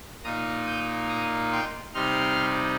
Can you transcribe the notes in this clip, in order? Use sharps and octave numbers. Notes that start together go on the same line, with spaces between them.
A#2 A#3 D#4 A#5 D#6
D#6 G6
A#5 D#6
G5 C6
C3 G3 D#4 C6 F6